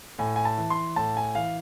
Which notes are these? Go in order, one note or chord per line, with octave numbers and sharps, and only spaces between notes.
A2 G#5
G#5
A5
E3
C6
A2 A5
G#5
E3 F5